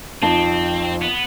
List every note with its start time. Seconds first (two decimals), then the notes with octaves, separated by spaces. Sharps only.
0.22 F2 C4 D#4 A5
1.02 B3